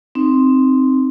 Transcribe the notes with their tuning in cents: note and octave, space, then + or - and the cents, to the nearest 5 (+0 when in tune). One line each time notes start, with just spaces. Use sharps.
C4 +0 D#4 -5